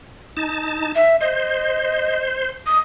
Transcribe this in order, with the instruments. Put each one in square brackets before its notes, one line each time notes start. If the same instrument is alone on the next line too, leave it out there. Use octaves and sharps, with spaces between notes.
[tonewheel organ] D#4 A5
[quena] E5
[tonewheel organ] C5 [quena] D#5
[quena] D#6